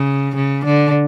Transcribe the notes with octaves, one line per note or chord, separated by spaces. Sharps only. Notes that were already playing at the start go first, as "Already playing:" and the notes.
Already playing: C#3
C#3
D3